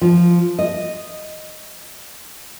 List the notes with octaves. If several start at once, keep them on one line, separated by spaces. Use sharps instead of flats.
F3
D#5